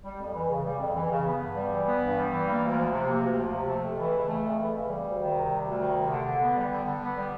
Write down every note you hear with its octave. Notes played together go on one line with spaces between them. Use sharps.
G3
F2
E3
C#3
G3
F2
E3
C#3
B3
G2
G3
E3
B3
G2
G3
E3
A#3
D2
F3
C3
A#3
D2
F3
C3
A3
F2
E3
C#3
A3
F2
E3
C#3
G3
D2
D#3
C3
G3
D2
D#3
C3
D3
D3
B3
G3
D3
D3
B3
G3